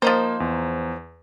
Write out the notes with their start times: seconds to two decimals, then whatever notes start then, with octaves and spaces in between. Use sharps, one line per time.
0.02 F3 A#3 D#4 C5
0.40 E2